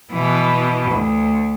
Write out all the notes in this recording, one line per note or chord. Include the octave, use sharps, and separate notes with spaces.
B2 E3
D2